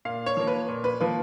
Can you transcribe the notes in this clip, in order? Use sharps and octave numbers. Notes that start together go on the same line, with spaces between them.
A#2 F5
C#5
F3 A#3
B4
A#2
B4
F3 A#3 B4